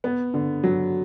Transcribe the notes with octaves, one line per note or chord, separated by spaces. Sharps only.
B3
D3
F#3